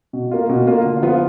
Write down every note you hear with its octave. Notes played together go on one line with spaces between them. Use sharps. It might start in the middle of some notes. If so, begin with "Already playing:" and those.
B2
A#3 F4
B2
A#3 F4
D3
F3 B3 F4